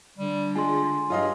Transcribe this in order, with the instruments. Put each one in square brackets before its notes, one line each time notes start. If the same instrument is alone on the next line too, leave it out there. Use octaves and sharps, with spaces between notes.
[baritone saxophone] D3 [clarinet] G3
[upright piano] G#3 [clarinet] F4 [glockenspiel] G#5 C6
[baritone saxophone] G2 [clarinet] F#3 [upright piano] F4 D#5 F5